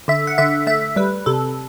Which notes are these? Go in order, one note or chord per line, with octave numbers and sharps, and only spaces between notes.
D3 E5
F#5
D3 E5
A3 E5
G3 B4
C3 A4